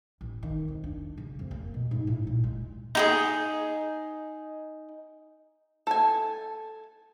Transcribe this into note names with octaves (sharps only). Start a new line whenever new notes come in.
A1
D#3
F2
D4
C#3
F2
A#3
B2
G#2
A2
A#2
G#3
D#4 G4 G#4
A4 G#5